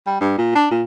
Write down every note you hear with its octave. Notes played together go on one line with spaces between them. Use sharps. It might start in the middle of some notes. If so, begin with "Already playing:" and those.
G3
G2
A#2
D4
A#2